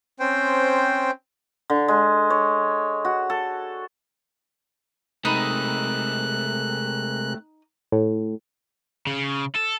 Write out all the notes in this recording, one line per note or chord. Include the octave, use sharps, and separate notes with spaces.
C4 C#4 C5 G5
D3
G#3
C#5
F#4
A4
C3 G#3 A3 C4 D#4 A#4 B5 F#6
A2
C#3
A4